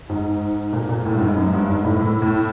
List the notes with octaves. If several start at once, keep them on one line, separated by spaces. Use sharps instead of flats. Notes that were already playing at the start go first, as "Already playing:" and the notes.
G#2
A#2
A#2
A2
G2
G#2
F#2
G2
G#2
A2
A2
A2